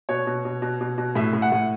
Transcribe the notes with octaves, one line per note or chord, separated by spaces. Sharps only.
B2 C#5
B2
B2
B2
B2
B2
A2 E5
A2
F#5
A2